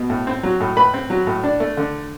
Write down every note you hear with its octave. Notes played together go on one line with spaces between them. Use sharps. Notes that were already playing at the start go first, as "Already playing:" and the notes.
Already playing: B2
A2
C4
F#3
A2
A2 B4 B5
C4
F#3
A2
D4
A3
D3